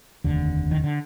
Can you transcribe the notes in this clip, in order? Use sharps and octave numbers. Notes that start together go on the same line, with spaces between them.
F1 D#2 D3
D#3
D3